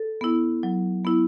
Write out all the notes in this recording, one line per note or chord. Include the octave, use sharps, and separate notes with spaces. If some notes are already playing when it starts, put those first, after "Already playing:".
Already playing: A4
B3 E4
F#3
B3 E4